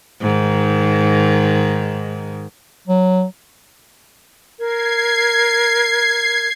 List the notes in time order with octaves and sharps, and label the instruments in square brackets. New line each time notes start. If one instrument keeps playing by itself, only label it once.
[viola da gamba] G#2 D#3
[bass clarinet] F#3
[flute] A#4 [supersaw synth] G#6 C7